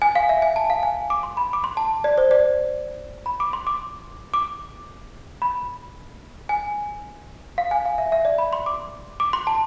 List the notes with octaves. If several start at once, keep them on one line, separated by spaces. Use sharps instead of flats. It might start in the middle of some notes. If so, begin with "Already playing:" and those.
G#5
F5
E5
G#5
A5
F5
G#5
D6
C6
B5
D6
C6
A5
D5
C5
D5
B5
D6
C6
D6
D6
B5
G#5
F5
G#5
F5
E5
E5
D5
B5
C6
D6
D6
C6
A5